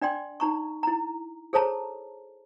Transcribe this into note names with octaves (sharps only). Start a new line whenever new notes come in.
D4 D5 G5 C6
D#4 A#5 C#6
E4 A#5
G#4 A4 C5 C#5 A5 A#5